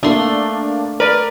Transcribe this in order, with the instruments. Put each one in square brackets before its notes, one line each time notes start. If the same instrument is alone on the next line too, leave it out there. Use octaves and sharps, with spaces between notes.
[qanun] A3 C6 [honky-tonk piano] A#3 D4
[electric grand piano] A#4 D5 [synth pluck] B4